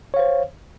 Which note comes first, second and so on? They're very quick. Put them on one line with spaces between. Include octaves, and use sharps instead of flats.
C#5 F5 C5